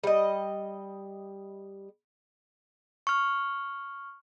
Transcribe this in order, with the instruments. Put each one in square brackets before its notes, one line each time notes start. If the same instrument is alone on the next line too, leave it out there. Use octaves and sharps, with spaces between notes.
[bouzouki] G3 D#5
[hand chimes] C#6 F6